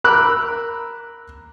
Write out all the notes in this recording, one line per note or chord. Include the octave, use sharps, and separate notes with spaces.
A#4 B5 D6 E6 F#6